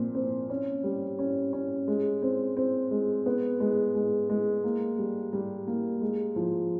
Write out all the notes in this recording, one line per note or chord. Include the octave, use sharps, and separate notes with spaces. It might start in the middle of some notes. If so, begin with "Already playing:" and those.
Already playing: A#2 F3 C4
C4
C#4
G3
C#4
C#4
G#3
C4
C4
G#3
B3
G#3
G#3
G#3
A#3
G3
G3
A#3
G#3
F3